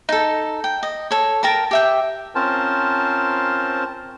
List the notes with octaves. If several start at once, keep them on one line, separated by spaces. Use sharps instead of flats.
D#4 A4
G5
D#5
A4 C#5
A#4 G5 A5 A#5
G4 E5 G5
C4 C#4 F4 A#4 C5 A5